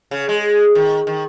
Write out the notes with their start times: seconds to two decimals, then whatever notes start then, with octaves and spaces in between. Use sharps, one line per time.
0.11 C#3
0.29 G#3
0.75 D#3
1.07 D#3